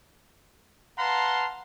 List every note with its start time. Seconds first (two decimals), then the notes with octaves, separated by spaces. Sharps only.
0.98 B4 F5 F#5 A5 A#5 C6